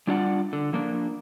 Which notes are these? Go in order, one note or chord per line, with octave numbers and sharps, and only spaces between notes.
G3 D4 F4 D5 F5 F#5
D3
F3 A#3 D4